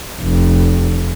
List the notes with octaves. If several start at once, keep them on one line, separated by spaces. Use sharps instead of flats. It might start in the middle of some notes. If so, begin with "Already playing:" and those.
F1